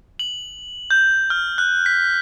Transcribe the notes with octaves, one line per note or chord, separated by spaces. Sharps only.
F#7
G6
F6
F#6
B6